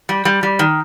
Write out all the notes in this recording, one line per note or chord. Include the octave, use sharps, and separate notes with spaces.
G3
G3
G3
D#3